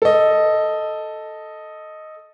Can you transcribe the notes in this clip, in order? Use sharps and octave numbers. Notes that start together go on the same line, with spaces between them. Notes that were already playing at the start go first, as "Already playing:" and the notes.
A4 D#5